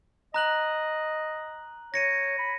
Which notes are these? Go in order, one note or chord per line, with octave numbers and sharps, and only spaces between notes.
D#5 A#5 F#6 F#7
C#5 A#6 C#7 D#7
B5